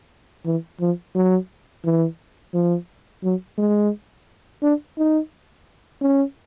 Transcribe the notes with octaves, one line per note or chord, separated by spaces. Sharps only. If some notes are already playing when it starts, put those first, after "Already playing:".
E3
F3
F#3
E3
F3
F#3
G#3
D4
D#4
C#4